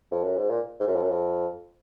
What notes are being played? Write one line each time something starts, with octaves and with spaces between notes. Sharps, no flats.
F2
F#2
G#2
A#2
G#2
F#2
F2
F#2
F2